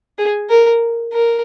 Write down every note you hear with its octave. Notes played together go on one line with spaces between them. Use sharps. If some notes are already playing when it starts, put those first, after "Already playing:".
G#4
A#4
A#4